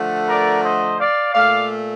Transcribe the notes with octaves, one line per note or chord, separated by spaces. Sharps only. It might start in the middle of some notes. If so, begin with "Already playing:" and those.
Already playing: D3 F3 A3
A#4 D5
C5 D#5
D5 F5
A#2 A3 D5 F5